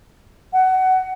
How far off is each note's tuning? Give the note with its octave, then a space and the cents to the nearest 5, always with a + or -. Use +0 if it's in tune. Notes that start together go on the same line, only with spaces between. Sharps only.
F#5 +20